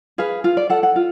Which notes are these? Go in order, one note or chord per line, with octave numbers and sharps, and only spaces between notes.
G#4 B4 F5
F4 F5
D5
A4 F#5
F#5
F4